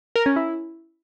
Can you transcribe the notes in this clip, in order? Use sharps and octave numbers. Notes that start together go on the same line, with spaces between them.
A#4
C#4
E4